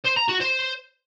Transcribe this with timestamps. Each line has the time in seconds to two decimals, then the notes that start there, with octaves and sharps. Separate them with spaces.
0.04 C5
0.16 A#5
0.28 F#4
0.40 C5